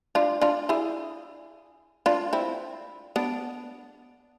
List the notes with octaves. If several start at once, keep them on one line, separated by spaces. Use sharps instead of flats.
D4 F4
D4 F4
E4 G#4
D4 F4
C4 E4
B3 D4